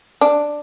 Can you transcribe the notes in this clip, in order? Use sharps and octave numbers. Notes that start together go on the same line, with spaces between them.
D4